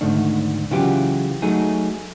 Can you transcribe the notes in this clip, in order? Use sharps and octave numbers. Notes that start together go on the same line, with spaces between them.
D2 G#2 D#3 A3 D4
C#3 E3 F#3 F4 G4
F#3 A3 D#4 G#4